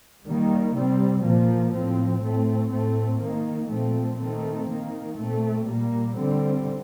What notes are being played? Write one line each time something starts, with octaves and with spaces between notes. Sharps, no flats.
D#3 G3 A#3
C3 G3 C4
A#2 F3 A#3
A2 F3 C4
A2 A3 C4
A2 A3 C4
D#3 A#3
A#2 F3 A3 C4
D#3 A3 C4
D#3 A#3
A#2 A3 C4
A#2 G3 A#3
D3 G3 C4